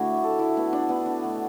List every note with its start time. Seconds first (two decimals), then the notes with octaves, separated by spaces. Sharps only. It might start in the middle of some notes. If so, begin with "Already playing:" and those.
Already playing: A2 D3 A3 D4 E4 F#4
0.24 A4
0.39 E4
0.57 B3
0.73 D4
0.89 B3
1.06 D4
1.23 B2 A3